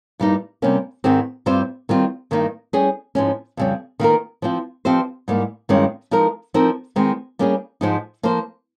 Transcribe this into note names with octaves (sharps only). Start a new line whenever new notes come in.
G2 G3 A#3 D#4
C3 G3 A#3 C#4
G#2 D#3 G#3 C4 G4
G2 G3 C4 F4 C5
D#3 G3 C4 F4
G2 D#3 A#3 D#4
G3 C#4 G#4
G#2 F3 G#3 C#4
F2 C#3 G3 C#4
D#3 A#3 F4 A#4
F3 C4 F4
F3 C4 D#4 G4 C5
G#2 G3 A#3
G2 D#3 G#3 C#4 F4
F3 G#3 D#4 A#4
F3 C4 D#4 A#4
D#3 G#3 C4
G3 A#3 C#4 G#4
G#2 F3 G#3 D#4
F3 A#3 F4 C5